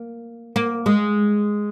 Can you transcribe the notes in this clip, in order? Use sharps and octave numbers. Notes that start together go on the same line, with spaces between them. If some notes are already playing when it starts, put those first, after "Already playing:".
Already playing: A#3
A#3
G#3